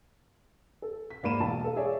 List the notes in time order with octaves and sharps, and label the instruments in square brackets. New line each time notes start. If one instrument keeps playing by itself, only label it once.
[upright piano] A4
B6
G#2 A#3 D5 B5 D#7 E7
E1 A5
A4 F5
G#4 C#5 D5 E5